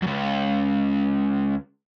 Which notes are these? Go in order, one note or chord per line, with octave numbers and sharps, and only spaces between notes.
C#2 F#2